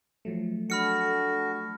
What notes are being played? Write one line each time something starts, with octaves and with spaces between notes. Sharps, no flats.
F3 F#3 A3
D4 F#4 A4 B5 F6 C#7